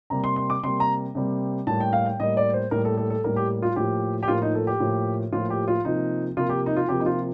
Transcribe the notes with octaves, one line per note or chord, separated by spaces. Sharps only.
C3 G3 A#3 A#5
C6
C6
D6
C3 G3 A#3 C6
A#5
C3 G3 A#3
A2 G3 A#3 A5
G5
F5
G5
A2 G3 A#3 D#5
D5
C5
A2 G3 A#3 A#4
A4
A4
A4
A2 G3 A#3 A#4
G4
F4
A2 F3 A#3 G4
G4
A2 F3 A#3 F4
D#4
A4
G4
A2 F3 A#3
A2 F3 A#3 F4
G4
F4
C3 F3 A#3 D#4
C3 F3 A#3 F4
G4
D#4
F4
C3 F3 A#3 G4
D#4
F4